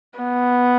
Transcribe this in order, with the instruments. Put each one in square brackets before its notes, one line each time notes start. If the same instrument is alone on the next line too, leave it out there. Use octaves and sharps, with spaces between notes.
[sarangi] B3